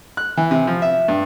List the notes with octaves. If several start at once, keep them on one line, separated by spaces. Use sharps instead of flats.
F#6
E3
C3
F3
E5
G2